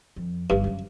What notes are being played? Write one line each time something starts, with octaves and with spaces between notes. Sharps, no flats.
F2
G1 G2 D#3
F#2 C#3